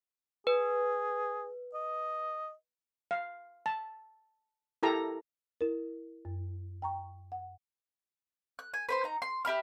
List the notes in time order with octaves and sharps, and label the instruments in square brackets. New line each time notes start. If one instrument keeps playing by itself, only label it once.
[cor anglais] G#4 [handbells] B4
[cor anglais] D#5
[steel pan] F5
A5
E4 G4 A4 A#4 A#5
[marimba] E4 A#4
F#2
G5 A#5 C#6
F#5
[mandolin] F#6
G#5
B4 C5 C6
D#4 A#5
C6
G4 E5 B5 F6